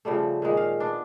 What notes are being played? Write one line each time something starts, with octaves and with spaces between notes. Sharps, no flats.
C#3 F3 G3 A3
A#2 D#3 G#3
F5
B3 D4